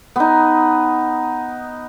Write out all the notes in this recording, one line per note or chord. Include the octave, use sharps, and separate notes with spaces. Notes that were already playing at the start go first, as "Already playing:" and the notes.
B3 D#4